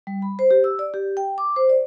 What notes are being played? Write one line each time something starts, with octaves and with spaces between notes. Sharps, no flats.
G3
B5
C5
G4
E6
D5
G4
G5
D6
C5
D5